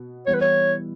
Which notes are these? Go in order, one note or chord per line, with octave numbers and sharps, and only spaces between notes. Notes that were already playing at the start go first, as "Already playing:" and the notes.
Already playing: B2 B3
E3 G3 B3 E4 C#5
B4
C#5